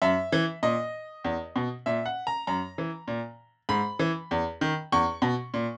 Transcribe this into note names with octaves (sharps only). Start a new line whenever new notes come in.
F#2 E5
E3
A#2 D#5
E2
B2
A#2 E5
F#5
A#5
F#2 A#5
E3
A#2
G#2 B5
E3
E2
D#3
E2 C#6
B2
A#2